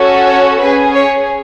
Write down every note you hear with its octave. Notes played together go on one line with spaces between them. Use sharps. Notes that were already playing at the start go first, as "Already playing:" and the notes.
Already playing: C#4 F#4 A4
C#5
C#4 G#4 B4
C#5